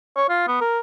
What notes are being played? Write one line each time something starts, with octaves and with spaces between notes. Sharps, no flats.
C#5
F4
B3
A#4